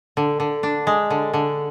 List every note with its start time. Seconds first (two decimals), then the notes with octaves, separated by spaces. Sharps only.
0.17 D3
0.40 D3
0.63 D4
0.87 G#3
1.10 D3
1.34 D3